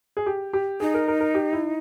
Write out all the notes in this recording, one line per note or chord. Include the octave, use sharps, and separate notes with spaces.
G#4
G4
G4
D#4 G#4
A#4
A#4
A#4
G4
E4